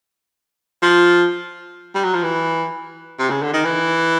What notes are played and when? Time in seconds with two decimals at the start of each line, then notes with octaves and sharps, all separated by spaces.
0.82 F3
1.95 G3
2.04 F#3
2.14 F3
2.23 E3
3.19 C3
3.30 C#3
3.43 D3
3.54 D#3
3.64 E3